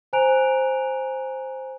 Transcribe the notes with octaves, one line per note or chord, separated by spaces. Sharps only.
C5 G#5 A#5 F#6 D7 F7